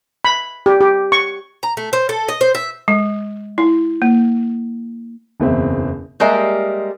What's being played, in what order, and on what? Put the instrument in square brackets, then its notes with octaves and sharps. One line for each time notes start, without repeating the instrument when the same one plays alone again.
[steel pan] B5
G4
G4
C#6
[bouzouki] A#5
A3
C5
A4
D#5
C5
E5
[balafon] G#3
E4
A#3
[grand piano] F#1 E2 B2 C4 E5
[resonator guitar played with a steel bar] G3 G#3 A#3 A#4 D#5 E5